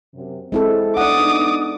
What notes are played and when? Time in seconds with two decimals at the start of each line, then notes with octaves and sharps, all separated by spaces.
0.15 F#2 C3
0.52 G#3 C4 E4 A4
0.97 B3 D4 D#4 D5 F#5 D6 D#6